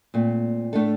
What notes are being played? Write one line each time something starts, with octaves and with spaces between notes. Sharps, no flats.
A#2 A3 C4
A2 A3 D4 A4